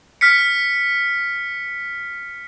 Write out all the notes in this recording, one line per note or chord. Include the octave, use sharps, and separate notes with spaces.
F6 B6 C#7